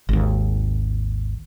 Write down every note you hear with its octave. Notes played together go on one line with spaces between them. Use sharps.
G#1 D#2